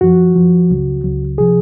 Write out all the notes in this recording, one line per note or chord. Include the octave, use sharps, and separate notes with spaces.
F#2 F3 F#4
F#2 F3
C#2 C#3 F#3
C#2 C#3 F#3
C3 F3 G#4